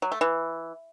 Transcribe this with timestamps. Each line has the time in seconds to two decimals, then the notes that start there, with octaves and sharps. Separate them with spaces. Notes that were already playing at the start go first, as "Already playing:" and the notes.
0.02 F#3
0.12 A3
0.21 E3